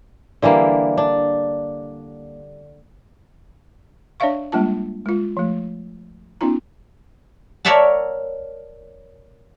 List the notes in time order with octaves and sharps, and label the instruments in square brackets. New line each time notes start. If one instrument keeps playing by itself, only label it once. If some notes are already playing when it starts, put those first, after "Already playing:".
[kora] D3 E3 G3 A#3
D4
[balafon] D4 C#5 D5 E5 F5 C#6
G3 G#3 A#3 D4 F4 A5
G#3 F4
F3 A3
B3 C#4 D#4 F4 A#5
[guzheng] A#4 C#5 D5 E5 F#5 A5